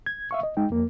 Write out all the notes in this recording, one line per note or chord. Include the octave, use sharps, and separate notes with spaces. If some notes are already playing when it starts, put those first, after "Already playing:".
G#6
E5 F5 C#6
D#5
G#3 D#4 G5
F2 A#3